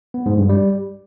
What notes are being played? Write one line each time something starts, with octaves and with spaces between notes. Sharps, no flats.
B3
G#2
G2
G3